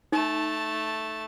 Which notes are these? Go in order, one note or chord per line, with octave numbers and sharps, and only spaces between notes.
A3 D#4 A5